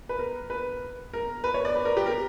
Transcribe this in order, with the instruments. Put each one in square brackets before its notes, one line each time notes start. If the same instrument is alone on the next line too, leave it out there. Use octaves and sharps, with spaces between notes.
[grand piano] B4
A#4
B4
A#4
B4
C#5
D5
B4
A#4
G4
A#4